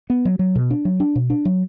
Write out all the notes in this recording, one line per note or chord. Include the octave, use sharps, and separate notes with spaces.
B3
F#3
F#3
B2
D4
F#3
D4
B2
D4
F#3